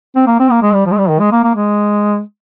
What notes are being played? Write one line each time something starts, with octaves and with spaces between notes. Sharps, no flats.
C4
A#3
C4
A#3
G#3
G3
F3
G#3
G3
D#3
G#3
A#3
A#3
G#3